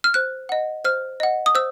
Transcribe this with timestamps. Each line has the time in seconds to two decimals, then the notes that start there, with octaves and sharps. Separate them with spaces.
0.04 F6
0.14 C5 F#6
0.49 D#5 F#5
0.85 C5 F6
1.20 D#5 F#5
1.46 D#6
1.55 C5 E6